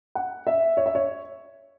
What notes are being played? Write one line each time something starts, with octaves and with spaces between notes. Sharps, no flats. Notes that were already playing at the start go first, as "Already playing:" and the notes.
F#5
E5
C#5
E5
C#5